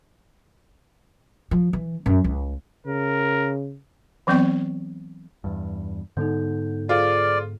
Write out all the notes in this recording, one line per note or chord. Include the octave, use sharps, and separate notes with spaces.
F3
E3
F#2
C#2
C#3 A#4
E3 F#3 B3 C4 D5 C#6
E2 G2
G#2 D3 B3 D#4 A4 G6
F4 G#4 A4 C5 D5